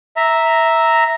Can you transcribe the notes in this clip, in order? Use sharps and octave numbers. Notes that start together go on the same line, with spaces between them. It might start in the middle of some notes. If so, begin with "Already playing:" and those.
E5 A#5